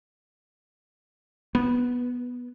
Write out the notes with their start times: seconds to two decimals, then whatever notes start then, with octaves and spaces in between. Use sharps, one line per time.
1.55 B3